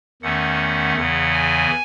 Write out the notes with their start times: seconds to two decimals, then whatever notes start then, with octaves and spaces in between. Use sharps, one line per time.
0.22 E2 D#3 A3 C#4 F#5
0.97 E2 C#3 E3 F#5
1.33 G#5